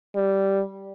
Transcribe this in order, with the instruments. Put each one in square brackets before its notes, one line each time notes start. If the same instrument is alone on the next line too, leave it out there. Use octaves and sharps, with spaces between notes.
[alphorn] G3